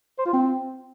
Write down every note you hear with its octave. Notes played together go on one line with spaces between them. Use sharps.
C5
F4
C4